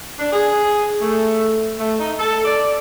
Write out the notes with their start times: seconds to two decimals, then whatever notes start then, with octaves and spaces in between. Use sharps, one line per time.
0.19 D4
0.33 G#4
1.02 A3
1.78 A3
1.99 D#4
2.19 A4
2.45 D5